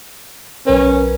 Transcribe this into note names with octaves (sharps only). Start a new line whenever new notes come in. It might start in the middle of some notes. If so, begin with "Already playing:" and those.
B1 C#4 A#4 B4